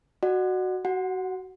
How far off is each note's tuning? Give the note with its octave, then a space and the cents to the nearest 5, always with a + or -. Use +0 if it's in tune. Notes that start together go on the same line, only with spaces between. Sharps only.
F#4 +0 D5 +45 F#5 +0
F#4 +20 F#5 -15